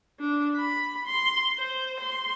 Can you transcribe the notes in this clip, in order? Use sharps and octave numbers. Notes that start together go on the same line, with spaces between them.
D4
B5
C6
C5
C6